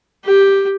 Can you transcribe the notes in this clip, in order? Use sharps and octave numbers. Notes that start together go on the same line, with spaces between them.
G4